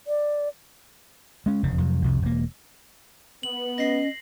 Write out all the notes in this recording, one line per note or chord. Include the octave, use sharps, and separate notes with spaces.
D5
G#3 C#4
F1 E2 C#3
F2 C3 F#3
C2 F2 C3
E1 A#3
B3 F#7
C#4 D#5 A#6 C7